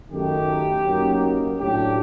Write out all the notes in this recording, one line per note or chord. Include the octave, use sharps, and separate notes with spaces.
F#2 D#3 A3 D#4 G4
F#2 F#3 A#3 D#4
A2 F#3 A3 D4 G4